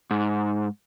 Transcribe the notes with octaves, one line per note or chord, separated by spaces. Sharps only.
G#2